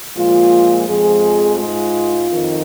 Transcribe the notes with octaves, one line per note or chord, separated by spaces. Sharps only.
A#2 F3 G#3 F4
F2 F3 G#3 G#4
G#2 G#3 F4
F2 D#3